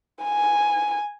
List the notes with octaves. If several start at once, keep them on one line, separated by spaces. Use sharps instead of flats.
G#5